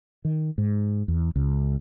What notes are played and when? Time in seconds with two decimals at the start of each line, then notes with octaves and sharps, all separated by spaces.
0.25 D#3
0.58 G#2
1.08 E2
1.36 C#2